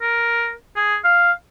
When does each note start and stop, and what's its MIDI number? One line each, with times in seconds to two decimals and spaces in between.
0.02 0.52 70
0.76 0.97 68
1.04 1.32 77